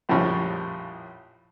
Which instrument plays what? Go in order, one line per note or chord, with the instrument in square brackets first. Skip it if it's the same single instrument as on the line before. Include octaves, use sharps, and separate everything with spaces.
[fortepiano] A#1 F2 A2 C#3 F3 G3